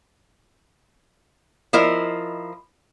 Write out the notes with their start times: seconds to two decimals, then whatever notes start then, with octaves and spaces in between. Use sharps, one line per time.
1.73 F3 E4 A#4 D#5